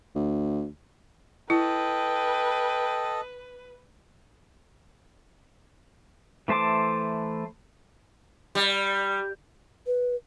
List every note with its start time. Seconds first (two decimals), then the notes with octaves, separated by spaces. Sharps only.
0.15 D2
1.50 E4 A4 B4 D#5 G5
6.48 E3 A3 C5 A5 D6
8.55 G3
9.87 B4